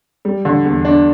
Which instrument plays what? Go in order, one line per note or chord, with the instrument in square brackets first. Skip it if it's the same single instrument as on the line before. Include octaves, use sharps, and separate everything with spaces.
[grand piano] G3
D3
E2
D4